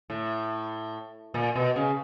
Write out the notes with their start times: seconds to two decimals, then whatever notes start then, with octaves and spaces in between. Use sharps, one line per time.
0.10 A2
1.34 A#2
1.55 B2
1.76 C#3